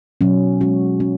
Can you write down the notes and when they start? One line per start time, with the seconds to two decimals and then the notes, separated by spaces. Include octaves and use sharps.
0.21 B2 F#3 C#4
0.61 G#3 C#4 F#4
1.00 G#3 C#4 F#4